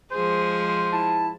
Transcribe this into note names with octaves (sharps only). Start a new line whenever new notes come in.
F3 G#3 G#4 C5
E4 A5